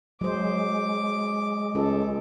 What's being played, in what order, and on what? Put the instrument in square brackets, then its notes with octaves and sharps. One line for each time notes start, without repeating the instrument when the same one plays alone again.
[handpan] F#3 C5 [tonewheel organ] G#3 [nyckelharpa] D6
[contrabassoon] C#2 [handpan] A4